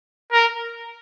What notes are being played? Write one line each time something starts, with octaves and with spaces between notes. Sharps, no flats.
A#4